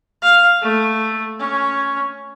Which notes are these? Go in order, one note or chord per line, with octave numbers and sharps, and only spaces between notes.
F5
A3
C#4